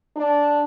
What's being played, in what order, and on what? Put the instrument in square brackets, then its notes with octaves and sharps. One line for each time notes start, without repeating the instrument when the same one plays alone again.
[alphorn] D4